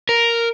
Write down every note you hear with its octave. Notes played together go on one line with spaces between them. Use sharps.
A#4